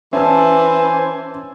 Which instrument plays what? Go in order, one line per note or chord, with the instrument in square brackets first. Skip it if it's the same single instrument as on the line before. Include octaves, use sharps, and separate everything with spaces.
[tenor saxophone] E3 [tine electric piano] C#4 [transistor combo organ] C5 G#5 [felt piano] E5 A5 E6